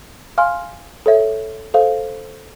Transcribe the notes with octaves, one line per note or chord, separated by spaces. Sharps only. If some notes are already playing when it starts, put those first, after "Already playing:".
F5 G#5 C6 F6
A4 C#5 E5
A4 C5 F5